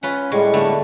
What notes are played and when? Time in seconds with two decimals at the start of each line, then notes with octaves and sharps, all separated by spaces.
0.03 C#4 F4 B4 F#5
0.32 A2 G3 G#3 C#6
0.54 D3 A3 B3